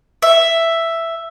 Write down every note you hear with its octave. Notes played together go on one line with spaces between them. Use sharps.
E5